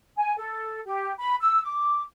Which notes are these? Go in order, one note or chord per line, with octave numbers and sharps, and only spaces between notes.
G#5
A4
G4
B5
E6
D6